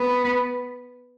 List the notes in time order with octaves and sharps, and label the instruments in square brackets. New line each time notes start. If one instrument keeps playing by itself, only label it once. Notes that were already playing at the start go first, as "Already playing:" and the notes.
Already playing: [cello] B3